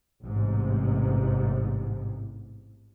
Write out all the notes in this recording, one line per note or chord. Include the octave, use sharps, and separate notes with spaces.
A1 G#2 C3